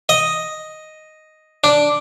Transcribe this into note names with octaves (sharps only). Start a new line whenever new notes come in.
D#5
D4